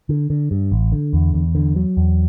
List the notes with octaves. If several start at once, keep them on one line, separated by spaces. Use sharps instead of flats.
D3
D3
G2
A1
D3
E2
E2
D3
F#3
E2